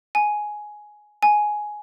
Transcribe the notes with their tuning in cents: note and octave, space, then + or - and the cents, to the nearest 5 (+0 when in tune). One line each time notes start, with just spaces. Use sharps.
G#5 +10
G#5 +10